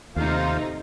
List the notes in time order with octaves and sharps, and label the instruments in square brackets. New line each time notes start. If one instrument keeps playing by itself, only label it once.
[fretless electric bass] D#2 [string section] C3 A3 D#4 [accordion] F4 C5 F5